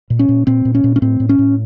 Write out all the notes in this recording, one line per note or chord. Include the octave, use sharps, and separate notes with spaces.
A#2
C#4
A#2
A#2 C4
A#2
C#4
A#2
C#4
A2 C4
A2
C#4
A2